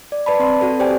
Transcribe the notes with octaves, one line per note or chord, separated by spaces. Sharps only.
D5
B4 D5 A5 B5
C4 C6
C4 F#4 A4 B4
G4 C5 D5 G5 G#5